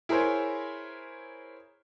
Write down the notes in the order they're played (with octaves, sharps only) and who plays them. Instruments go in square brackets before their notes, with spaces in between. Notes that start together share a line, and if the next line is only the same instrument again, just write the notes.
[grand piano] E4 G#4 A#4 C5 C#5